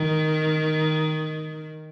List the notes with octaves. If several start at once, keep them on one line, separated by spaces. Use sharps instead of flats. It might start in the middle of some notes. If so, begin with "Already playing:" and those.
Already playing: D#3